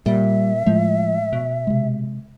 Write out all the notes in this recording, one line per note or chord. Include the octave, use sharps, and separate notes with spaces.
A#2 G3 E5
A2 F3 G#3 A3
B2
C3 G#3